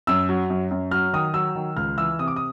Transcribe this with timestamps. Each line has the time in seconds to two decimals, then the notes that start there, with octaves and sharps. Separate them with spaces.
0.07 F#2 E6
0.29 F#3
0.50 F#2
0.71 F#2
0.91 F#3 F6
1.13 D#3 D#6
1.34 F#3 E6
1.55 D#3
1.77 C#2 F6
1.98 E3 E6
2.19 C3 D#6
2.28 D6
2.36 D#6